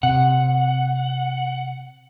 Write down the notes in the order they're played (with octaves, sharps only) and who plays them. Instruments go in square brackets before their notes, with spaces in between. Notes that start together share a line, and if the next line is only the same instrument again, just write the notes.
[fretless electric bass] C3 [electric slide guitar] F#5